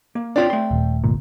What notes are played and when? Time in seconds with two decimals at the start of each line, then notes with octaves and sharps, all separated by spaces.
0.15 A#3
0.36 C4 D4 F4 G4 C#5 D5
0.50 A3 C6
0.71 D#1
1.04 G1 C2 A#2